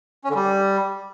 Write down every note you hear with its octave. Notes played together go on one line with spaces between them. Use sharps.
C#4
D3
G3